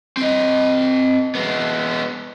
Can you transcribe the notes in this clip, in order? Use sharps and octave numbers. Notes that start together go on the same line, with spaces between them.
C4 D#5
G#3 B3